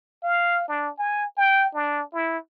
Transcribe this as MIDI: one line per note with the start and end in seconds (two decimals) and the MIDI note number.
0.23 0.63 77
0.68 0.89 62
0.99 1.26 80
1.37 1.68 79
1.74 2.02 62
2.13 2.38 64